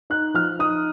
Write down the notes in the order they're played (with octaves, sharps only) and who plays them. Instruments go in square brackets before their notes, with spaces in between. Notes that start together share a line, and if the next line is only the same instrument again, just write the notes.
[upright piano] D#4 F#6
F3 F6
D#4 D#6